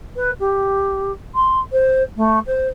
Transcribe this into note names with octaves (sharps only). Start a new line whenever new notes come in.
B4
G4
C6
C5
A3
C5